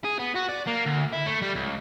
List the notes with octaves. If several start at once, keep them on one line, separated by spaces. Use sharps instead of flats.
G#4
B3
F#4
D5
A#3
D2
E4
A3
G3
C#2